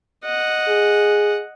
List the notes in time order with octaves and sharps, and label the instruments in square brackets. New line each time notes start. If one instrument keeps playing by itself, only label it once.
[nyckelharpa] D#5 F#5
[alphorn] G#4